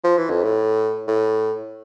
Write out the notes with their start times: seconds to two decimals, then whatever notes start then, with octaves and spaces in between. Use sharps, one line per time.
0.04 F3
0.18 E3
0.30 F2
0.43 A2
1.08 A2